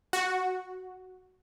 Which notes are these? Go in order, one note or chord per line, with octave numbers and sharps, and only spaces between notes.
F#4